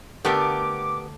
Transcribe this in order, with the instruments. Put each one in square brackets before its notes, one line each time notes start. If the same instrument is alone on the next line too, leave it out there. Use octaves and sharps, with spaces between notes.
[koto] D3 A3 [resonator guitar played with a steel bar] B3 G4 A#4 [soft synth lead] D6